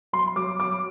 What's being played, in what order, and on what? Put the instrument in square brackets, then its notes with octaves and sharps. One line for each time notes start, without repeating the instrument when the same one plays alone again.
[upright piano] F#3 C6
F#3 D6
F#3 D6